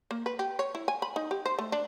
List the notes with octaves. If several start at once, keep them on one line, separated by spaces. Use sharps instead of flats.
A#3
B4
G4
C#5
E4
G#5
B5
D#4
G4
C5
A3
D4